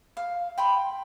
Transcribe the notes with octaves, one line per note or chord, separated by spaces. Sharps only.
F5
G5 B5 C6